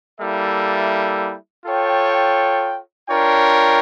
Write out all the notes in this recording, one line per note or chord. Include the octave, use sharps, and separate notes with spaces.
G3 A#3 E4 A4 E5
F4 A4 C#5 G5
D4 F4 A#4 C#5 G5